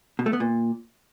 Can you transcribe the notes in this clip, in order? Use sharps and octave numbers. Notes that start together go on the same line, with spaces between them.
B2
A3
B3
A#2